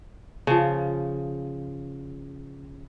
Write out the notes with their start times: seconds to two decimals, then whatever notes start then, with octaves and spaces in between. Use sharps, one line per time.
0.47 C#3 F3